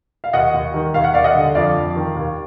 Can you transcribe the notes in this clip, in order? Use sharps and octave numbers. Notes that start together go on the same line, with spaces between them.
F5
D#2 D#5 F#5
D#2
D#3
D#2 F5
F#5
D#2 D5 F5
D#5 F#5
D3
F2 D5 F5
F2
D#3
D#2